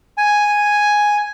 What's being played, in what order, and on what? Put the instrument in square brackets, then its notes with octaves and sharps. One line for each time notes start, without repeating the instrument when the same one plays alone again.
[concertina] G#5